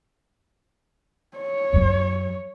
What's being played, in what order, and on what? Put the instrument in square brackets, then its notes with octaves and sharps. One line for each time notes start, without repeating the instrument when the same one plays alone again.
[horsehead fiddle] C#5
[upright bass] F#2 F#3